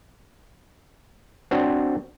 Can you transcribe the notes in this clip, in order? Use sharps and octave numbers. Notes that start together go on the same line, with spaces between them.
C4 D4 F#4 C5